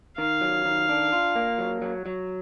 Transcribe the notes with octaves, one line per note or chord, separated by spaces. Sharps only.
D#3 F5
F#3
D#3
D4
F4
A#3
F#3
F#3
F#3